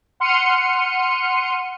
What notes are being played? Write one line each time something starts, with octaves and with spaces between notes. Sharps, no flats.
F#5 C6 F6 C#7 D#7